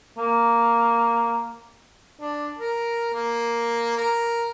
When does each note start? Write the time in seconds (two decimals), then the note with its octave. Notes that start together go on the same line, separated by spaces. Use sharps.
0.18 A#3
2.19 D4
2.58 A#4
3.13 A#3
3.97 A#4